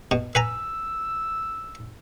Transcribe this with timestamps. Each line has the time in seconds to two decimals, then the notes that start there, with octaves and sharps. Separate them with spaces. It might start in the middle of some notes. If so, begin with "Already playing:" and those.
0.11 B2
0.35 B4 G#5 A#5 E6